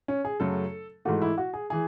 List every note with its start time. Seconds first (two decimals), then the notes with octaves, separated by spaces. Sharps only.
0.08 C#4
0.25 G#4
0.40 F#2 C#3 F#3 A3 A4
1.05 G#2 E3 A3 F#4
1.22 E4
1.38 F#4
1.53 G#4
1.70 E3 G#4